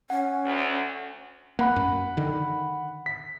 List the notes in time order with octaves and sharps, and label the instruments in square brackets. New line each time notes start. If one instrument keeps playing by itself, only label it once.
[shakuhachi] C#4 [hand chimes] F#5
[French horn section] D2
[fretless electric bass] A#3 [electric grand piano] F#5 B5 F#6
[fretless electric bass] F#2
D3 D#3
[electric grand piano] B6